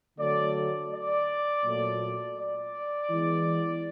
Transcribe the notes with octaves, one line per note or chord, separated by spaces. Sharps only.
D3 F#3 A3 D5
D5
A#2 F#3 A3
D5
E3 G#3 B3